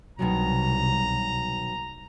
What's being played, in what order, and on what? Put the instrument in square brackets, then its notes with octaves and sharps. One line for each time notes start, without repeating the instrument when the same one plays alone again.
[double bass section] C2 [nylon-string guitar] B2 D#3 F#3 [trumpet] A#5